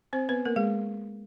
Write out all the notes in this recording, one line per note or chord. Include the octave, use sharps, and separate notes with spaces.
C4 C5
B3 B4
A#3 A#4
G#3 G#4